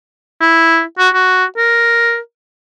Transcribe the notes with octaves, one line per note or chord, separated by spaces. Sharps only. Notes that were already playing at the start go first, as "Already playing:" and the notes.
E4
F#4
F#4
A#4